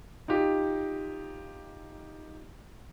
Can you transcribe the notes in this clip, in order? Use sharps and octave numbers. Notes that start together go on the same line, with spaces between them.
D#4 F4 G4